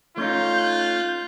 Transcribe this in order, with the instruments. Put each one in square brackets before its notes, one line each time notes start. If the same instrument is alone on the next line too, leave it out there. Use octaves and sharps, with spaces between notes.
[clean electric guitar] A3 C#4 D#4 [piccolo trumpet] F4 [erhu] G6